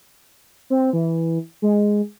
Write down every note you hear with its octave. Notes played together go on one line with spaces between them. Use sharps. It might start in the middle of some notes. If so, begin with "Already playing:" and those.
C4
E3
G#3